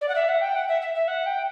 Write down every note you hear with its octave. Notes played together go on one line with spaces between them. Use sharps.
D5
F#5
E5
F#5
G5
F#5
E5
E5
E5
F#5
G5